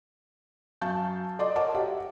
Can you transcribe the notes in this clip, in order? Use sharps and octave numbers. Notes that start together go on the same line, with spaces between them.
F#2 F5 A5 C#6 G6
A4 D5 D#5 C6 D6
A#4 C#5 D#5 F#5 A5 D6
F#4 G4 E5